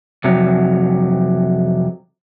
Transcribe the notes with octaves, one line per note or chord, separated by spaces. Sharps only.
F2 C3 F#3